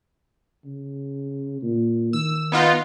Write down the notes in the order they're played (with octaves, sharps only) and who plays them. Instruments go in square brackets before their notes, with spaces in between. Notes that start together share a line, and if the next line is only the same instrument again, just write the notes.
[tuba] C#3
A#2
[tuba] D#3 [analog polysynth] E6
[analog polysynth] B3 D#4 F4